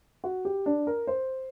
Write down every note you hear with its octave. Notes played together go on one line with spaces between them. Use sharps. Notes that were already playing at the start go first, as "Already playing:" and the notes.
F#4
G4
D4
A#4
C5